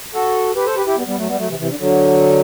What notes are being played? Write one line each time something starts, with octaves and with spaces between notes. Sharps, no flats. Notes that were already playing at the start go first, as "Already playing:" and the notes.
F#4 A4
G4 B4
A4 C5
G4 B4
E4 G4
G3 B3
G3 B3
F#3 A3
G3 B3
F#3 A3
C3 E3
C3 E3
D3
D3 F#3